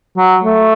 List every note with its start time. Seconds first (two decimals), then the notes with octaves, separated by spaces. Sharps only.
0.17 F#3
0.44 A3